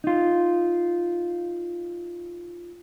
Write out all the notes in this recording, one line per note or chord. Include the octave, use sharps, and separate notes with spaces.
D#4 F4